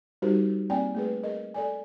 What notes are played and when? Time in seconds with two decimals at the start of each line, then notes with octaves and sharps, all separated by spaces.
0.22 G3 D#4 F#4 G4 A#4 C5
0.70 A#3 C4 D5 G5 G#5
0.95 A3 G#4 B4
1.23 G#4 A#4 D#5
1.54 A4 D5 G#5